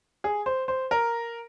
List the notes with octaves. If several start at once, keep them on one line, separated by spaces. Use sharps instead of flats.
G#4
C5
C5
A#4